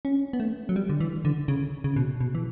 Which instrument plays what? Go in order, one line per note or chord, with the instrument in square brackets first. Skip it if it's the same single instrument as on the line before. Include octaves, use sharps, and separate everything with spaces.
[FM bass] C#4
B3
A3
F#3
G3
D3
E3
D3
C#3
C#3
B2
B2
E3